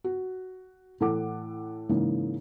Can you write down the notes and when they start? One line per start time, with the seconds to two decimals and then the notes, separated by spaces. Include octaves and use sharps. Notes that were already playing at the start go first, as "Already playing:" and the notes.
0.04 F#4
1.00 A2 E3 A4 F#5 D6
1.89 G#2 C#3 E3 G#3 A#3 D#4